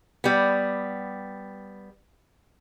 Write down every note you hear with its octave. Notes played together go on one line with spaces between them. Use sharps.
G3 B3